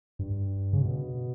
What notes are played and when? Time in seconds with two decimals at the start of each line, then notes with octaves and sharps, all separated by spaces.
0.19 G2
0.73 C#3
0.82 B2